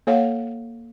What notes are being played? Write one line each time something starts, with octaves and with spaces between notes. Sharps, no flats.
A#3 A4 C#5 F5 F#5